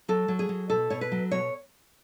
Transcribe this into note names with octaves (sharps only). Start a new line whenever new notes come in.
F#3 A4
F#3
G#4
F#3
B2 A4
B2 C#5
B4
F#3
B2 C#5